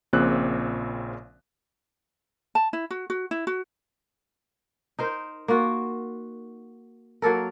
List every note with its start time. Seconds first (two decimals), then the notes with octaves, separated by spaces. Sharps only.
0.13 A#1 A#2 C#3 C4 F#6
2.55 A5
2.73 E4
2.91 F#4
3.10 F#4
3.31 E4
3.47 F#4
4.99 D#4 A#4 C5
5.48 A#3 F4 F#4
7.22 F#3 A#3 A4 A#4